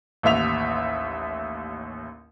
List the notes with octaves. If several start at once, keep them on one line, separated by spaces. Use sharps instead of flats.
A1 D#2 E5 F7